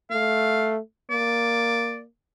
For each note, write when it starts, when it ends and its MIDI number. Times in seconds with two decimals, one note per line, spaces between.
0.11 0.79 57
0.11 0.74 77
1.11 2.07 58
1.11 2.00 74